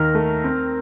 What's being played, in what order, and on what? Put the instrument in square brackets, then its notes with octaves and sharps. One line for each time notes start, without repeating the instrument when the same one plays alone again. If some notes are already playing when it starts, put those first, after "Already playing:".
Already playing: [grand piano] D#2 D#3 [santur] A#4
[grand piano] A3
C4